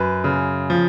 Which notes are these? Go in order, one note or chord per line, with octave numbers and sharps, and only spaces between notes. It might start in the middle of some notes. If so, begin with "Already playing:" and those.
Already playing: F#2 B4
C#3
F3